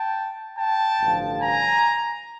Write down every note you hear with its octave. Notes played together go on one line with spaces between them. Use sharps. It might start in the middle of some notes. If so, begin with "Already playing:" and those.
Already playing: G5 A5
G5 A5
A1 G2 D3 F3
G#5 A#5